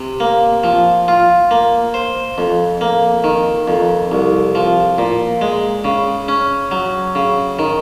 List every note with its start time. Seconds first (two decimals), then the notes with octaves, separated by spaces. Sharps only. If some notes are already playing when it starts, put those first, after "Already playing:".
Already playing: C3
0.20 A#3
0.64 F3
1.08 F4
1.51 A#3
1.94 C5
2.38 F2
2.81 A#3
3.24 D#3
3.67 F2
4.12 C2
4.55 F3
4.98 A#2
5.41 G#3
5.84 C#3
6.28 C#4
6.71 F#3
7.15 C#3
7.59 D#3